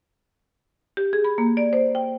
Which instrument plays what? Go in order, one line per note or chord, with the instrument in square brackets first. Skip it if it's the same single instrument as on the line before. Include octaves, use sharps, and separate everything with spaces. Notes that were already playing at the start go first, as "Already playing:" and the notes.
[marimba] G4
G#4
B5
A#3
D5
C5
G5